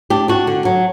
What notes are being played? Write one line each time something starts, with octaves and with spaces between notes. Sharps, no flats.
D4 G4
D4 F#4
D3
F#3